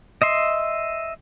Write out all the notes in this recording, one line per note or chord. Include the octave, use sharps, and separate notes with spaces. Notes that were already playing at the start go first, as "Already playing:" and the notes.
D#5 E5 C6